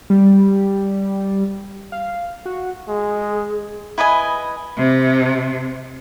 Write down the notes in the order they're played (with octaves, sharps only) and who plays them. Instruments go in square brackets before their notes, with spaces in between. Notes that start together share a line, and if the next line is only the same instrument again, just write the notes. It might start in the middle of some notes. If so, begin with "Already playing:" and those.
[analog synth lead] G3
F5
F#4
[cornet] G#3 [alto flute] G#4
[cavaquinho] E4 B4 D#5 G#5
[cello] C3